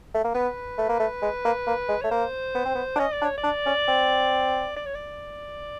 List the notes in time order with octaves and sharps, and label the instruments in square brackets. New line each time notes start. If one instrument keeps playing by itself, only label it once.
[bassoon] A3
A#3
[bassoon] B3 [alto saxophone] B4
[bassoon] A3
A#3
A3
G#3
A#3
A#3
G#3
[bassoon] A3 [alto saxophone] C#5
[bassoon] A#3 [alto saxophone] C5
[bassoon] B3
C4
B3
D4
[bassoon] C#4 [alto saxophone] D#5
[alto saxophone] D5
[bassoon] D4
[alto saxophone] C#5
D5
[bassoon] D4
C#4
C4
[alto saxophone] D5
C#5
D5